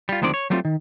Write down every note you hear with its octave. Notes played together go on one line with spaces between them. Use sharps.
G3 F4
D2 D#3 F3 G#3 C4 D5
C#5
F#3 G3 A3 C4 D#4 F4
D#3